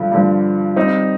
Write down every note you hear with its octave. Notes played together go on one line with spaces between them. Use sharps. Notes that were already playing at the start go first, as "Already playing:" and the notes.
Already playing: G2 D3 F3
G2 D3 F3
G3 C4 D#4